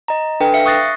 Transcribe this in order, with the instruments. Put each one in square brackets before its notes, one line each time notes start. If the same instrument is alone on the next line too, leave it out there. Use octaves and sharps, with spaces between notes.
[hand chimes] D#5 A#5
D4 A4 B4 G5
E5 F5 C#7
C#6 D#6 F#6 A6 A#6 C7